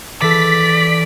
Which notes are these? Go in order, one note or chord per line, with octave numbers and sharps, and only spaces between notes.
E3 A4 D5 B6